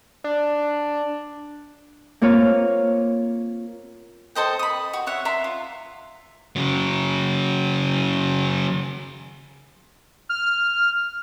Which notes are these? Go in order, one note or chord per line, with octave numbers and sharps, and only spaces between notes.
D4
A#3 C4 F4 C#5 F5
A4 C5 D#5 G5
B5 D#6
F#4
C#5 E5 F#5
E5 A#5 C6 D6
F4
C#3 F#3
F6